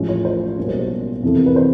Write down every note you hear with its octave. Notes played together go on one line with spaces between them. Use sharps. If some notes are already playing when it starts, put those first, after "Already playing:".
Already playing: A1 A2 F3 G#3 C#4
C#5
C5
B1 B2 G3 A#3 C#4 A#4
C5
C5
F2 C3 E3 A4
A#4
B4
C5